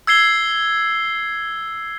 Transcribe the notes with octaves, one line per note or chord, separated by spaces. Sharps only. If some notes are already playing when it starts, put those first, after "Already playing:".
E6 G#6 C7 G7